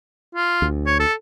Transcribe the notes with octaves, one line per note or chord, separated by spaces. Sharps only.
F4
D2
C#5
A4